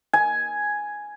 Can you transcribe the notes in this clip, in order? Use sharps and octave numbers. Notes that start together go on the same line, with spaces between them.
G#5